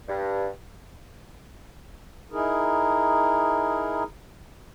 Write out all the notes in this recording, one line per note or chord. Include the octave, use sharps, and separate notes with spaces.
G2
D#4 E4 G#4 A#4